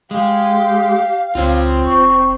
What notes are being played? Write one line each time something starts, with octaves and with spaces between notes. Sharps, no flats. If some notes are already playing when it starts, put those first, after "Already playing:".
G#3 G4 F5
C#2 C4 F4 C#5
F1 C#6